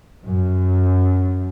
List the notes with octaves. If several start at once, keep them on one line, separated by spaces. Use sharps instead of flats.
F#2